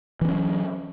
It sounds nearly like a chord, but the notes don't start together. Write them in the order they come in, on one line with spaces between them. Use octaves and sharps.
E3 C4 C#4 F#3